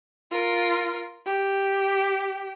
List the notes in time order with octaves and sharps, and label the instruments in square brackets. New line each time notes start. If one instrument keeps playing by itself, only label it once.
[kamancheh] F4 A#4
G4